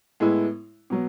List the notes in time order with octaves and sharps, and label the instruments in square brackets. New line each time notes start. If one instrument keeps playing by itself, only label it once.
[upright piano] A2 G#3 B3 E4
B2 F#3